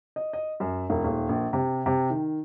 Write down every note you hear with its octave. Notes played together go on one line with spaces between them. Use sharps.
D#5
D#5
F#2
E1
D#1
A#1
C3
C3
D#3